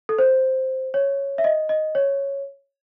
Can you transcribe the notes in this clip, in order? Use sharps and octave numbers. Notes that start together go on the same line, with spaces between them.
A4
C5
C#5
E5
D#5
D#5
C#5